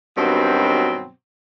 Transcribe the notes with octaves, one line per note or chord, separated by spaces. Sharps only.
G2 B2 D#3 F#3 C4